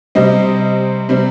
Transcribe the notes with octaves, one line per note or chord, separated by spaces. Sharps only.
C3 G3 C4 D#5
C3 G3 C4